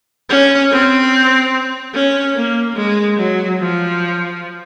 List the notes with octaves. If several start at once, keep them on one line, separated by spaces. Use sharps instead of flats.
C#4
C4
C#4
A#3
G#3
F#3
F3